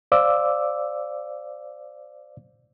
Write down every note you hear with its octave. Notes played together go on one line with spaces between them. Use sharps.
C5 D5 F5 D6 E6